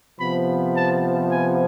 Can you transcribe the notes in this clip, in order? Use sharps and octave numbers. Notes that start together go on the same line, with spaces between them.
C3 F3 B3 B5
A5
G#5